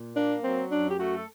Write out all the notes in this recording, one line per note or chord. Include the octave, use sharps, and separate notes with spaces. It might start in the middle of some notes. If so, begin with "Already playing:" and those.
Already playing: A#2
A#3 D4
F#3 C4
F#2 D4
G4
A3 F#4
A4